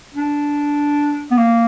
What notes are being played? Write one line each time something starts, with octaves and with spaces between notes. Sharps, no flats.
D4
B3
A#3